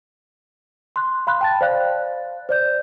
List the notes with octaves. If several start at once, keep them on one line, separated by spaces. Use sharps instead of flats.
C6 F#6
F5 B5 C6 F#6
G5 A5 A6
C5 D5 F5 F#6
C5 D5 G6